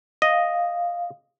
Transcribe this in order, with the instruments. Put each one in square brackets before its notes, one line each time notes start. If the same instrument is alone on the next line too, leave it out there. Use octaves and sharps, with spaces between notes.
[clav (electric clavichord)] D#5 [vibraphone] F5